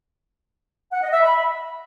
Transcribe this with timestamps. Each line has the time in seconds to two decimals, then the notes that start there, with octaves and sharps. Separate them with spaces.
0.91 F#5
1.02 D#5
1.12 E5
1.22 B5